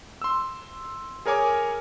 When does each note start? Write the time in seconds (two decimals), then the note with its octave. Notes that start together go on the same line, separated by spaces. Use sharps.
0.22 C6 E6
1.26 G#4 A#4 C#5 G#5 D6